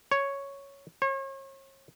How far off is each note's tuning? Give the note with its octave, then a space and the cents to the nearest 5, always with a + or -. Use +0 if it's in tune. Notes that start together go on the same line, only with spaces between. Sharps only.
C#5 +0
C#5 -40